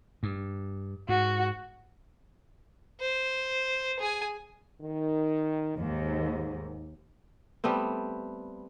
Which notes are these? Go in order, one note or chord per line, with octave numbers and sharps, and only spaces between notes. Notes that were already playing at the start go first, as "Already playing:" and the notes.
G2
G#2 F#4
C5
G#4 G#5
D#3
D#2 G#2
G3 A3 B3 C4